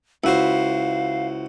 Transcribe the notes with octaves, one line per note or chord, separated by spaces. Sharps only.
C#2 E4 F#4 C5 F5